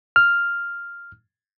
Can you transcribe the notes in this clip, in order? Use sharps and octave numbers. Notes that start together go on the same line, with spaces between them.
F6